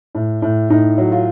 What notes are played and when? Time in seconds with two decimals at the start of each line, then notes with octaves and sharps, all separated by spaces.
0.15 A2
0.42 A2
0.70 A2 D#4
0.98 F#3
1.12 F4